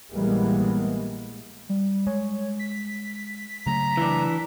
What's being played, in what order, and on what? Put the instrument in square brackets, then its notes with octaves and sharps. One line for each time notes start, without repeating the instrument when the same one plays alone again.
[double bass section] A#1 E3 G3 G#3 A#3 B3
[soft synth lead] G3
[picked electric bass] G#3 [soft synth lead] C#5
[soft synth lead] B6
[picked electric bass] C#3 F#3 A3 [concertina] A#5
[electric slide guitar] E3 D4